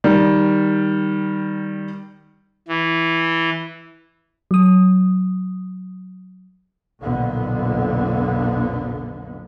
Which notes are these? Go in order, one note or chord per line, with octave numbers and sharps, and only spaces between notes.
D#3 G3
E3
F#3 D#6
B1 F2 A#2 D3 B3